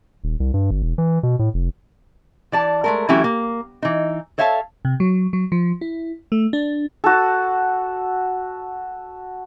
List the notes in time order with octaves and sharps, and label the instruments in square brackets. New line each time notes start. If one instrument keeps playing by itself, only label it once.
[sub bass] D#1
C2
G2
G1
E1
E3
B2
A2
F1
[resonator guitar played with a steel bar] E3 D5 A5
G#3 A3 A#4
E3 F#3 A3 C#4 E4 G4
A#3
E3 D#4
A4 C#5 E5 F5 G5 A5
[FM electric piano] C3
F#3
F#3
F3
E4
A3
D4
[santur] F#4 A4